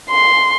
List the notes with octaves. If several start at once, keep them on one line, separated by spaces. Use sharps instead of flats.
C6